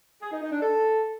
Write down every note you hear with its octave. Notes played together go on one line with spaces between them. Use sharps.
G#4
D#4
D#4
D4
A4